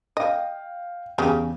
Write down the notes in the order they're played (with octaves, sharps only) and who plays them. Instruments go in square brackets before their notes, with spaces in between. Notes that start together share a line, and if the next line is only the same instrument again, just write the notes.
[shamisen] D#5 [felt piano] F5 G5
[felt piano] E2 [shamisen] C#3 G4 G#4